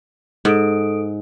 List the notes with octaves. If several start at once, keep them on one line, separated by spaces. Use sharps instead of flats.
G#2 A4 D#6 D7